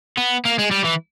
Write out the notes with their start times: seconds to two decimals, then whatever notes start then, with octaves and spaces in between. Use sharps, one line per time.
0.17 B3
0.45 A#3
0.59 G#3
0.71 G3
0.85 E3